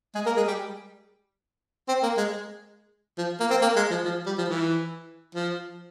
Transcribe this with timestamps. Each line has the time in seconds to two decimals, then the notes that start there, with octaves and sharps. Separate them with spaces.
0.15 G#3 G#4
0.26 A#3 A#4
0.37 G#3 G#4
0.48 G3 G4
1.89 C4
2.03 A#3
2.18 G#3
3.18 F3
3.40 A#3
3.51 C4
3.62 A#3
3.76 G#3
3.91 F3
4.05 F3
4.27 G3
4.38 F3
4.49 E3
5.35 F3